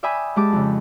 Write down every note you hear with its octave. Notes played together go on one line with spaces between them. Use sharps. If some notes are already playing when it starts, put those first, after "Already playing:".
D5 E5 G5 G#5 B5 D#6
G#3 G4 A5 D6
F2 C#3